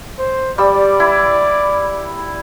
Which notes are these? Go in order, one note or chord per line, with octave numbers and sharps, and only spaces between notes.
C5
G3 D5 E6
E4